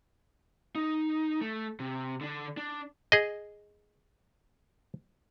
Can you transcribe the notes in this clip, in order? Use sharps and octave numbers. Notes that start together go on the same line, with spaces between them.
D#4
A3
C3
D3 D4
D4
G#4 D#5